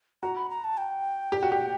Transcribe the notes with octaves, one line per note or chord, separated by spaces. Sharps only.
F#4 A#5
B5
A#5
A5
G5
G4
F#4
G4